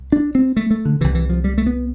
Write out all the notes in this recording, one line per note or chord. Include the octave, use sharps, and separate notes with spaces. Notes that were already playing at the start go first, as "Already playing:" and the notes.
Already playing: C2
D4
C4
A3
A3
D3
C2 C3 E3
E3
F3
G3
A3
B3